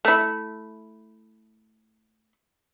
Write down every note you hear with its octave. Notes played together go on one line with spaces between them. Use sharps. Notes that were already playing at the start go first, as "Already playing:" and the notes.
A3 E4